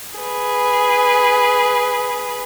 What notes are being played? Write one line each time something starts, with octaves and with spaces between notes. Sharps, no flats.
G#4 B4